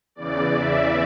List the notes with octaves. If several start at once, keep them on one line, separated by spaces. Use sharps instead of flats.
E2 C#3 E3 D5
E5